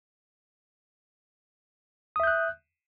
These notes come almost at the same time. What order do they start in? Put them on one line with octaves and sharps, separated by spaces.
D#6 E5 G6 F#6